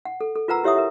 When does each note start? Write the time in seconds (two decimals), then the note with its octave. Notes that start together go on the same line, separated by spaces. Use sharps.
0.05 F#5
0.21 A4
0.36 A4
0.48 F4 A#4 B4 F#5 A#5 E6
0.64 E4 G4 C#5 E5 F#5 D#6
0.76 A#4 E5